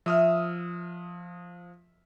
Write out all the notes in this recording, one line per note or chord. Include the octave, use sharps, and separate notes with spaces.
F3 E5 D#6 F6